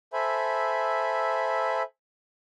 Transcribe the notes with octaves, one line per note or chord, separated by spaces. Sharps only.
A4 C5 E5 G#5 B5